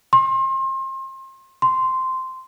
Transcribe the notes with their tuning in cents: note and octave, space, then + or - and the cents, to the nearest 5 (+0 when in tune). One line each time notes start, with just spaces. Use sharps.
C6 +35
C6 -10